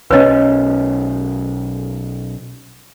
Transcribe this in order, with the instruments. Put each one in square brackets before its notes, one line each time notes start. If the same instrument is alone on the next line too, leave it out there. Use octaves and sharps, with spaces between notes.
[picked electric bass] B1 D#3 C#4 [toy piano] B4 C#5 D#5